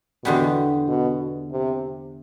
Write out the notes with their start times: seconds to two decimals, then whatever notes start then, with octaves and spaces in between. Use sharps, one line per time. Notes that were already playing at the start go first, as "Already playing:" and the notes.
0.24 E2 B2 D3 G3 B3
0.88 B2
1.52 C3